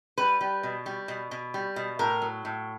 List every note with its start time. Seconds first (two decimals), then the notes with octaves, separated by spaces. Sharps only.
0.18 G3 B4
0.41 G3
0.63 B2
0.86 G3
1.08 B2
1.31 B2
1.54 G3
1.76 B2
1.99 A2 A#4
2.22 F#3
2.45 A2